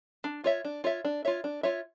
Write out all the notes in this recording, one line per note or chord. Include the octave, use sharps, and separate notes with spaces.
D4
F4 C#5 E5
D4
F4 C#5 E5
D4
F4 C#5 E5
D4
F4 C#5 E5